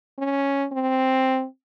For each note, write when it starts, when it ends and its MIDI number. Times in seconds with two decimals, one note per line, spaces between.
0.19 0.66 61
0.72 1.45 60